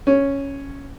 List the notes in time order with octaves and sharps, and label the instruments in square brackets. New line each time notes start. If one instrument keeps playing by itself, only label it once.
[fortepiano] C#4